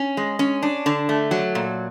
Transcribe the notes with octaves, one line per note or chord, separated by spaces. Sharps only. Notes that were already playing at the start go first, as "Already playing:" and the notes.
Already playing: C#4
G#3
C#4
D4
D3
A3
F#3
A#2